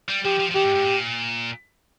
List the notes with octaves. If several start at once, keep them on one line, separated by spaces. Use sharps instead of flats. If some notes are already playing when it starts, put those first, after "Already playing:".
G3
F3 G4
F3
F3
D#3 G4
G#2
G#2
A#2